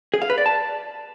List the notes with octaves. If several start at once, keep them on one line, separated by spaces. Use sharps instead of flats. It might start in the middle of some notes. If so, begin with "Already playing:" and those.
G#4
F5
B4
D5
A5